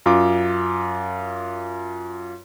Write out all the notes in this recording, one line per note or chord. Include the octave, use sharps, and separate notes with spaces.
F#2 F4 D6